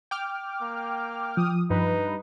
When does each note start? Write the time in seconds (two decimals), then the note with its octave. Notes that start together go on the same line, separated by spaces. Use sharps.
0.11 G5 D6 F6
0.62 A#3
1.37 F3 D#6
1.70 G2 D#4 B4